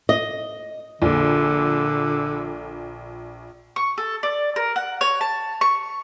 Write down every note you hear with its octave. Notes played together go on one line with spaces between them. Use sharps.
D#5
A#1 D3
C#6
A4
D5
A#4
F#5
C#5
A5
C#6